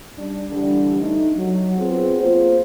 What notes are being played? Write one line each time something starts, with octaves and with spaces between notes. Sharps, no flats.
G3 D4
D3 E3 G3 D4
A3 D#4
F#3
B3 C4 F4 F#4 G#4
A#3 F4 C5